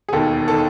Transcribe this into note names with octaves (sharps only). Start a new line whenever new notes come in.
G#4
E1 D#2 D#3 A4
D#3 A4